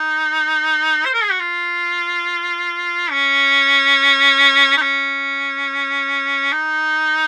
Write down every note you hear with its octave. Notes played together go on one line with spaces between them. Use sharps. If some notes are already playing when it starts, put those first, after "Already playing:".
Already playing: D#4
C5
A#4
G#4
F#4
F4
C#4
D#4
C#4
D#4